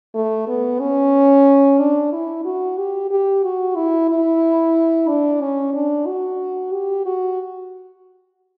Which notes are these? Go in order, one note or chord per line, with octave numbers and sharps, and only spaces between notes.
A3
B3
C#4
D4
E4
F#4
G4
G4
F#4
E4
E4
D4
C#4
D4
F#4
G4
F#4